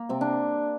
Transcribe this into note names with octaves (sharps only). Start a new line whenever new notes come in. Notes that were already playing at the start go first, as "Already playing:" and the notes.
Already playing: A#3
C3 C4
D4